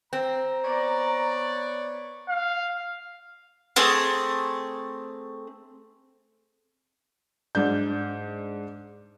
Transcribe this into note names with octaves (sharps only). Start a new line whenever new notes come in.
C4 A#5
B3 C#5 D5
F5
A3 C4 G#4 D#6
G#2 D4 G6